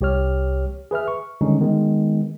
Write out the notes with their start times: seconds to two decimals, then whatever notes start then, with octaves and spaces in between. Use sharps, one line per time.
0.01 C2 G4 C#5 F6
0.91 G#4 B4 E5 F6
1.08 C#6
1.41 D3 D#3 G3 G#3 C#4 D#4
1.61 D#3 G#3 B3